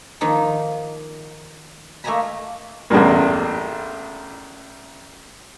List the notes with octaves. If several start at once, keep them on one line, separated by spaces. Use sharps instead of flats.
D#3 F3 A#3 D#4
A3 A#3 D#5 G#5 A#5 B5
A1 E2 G2 A#2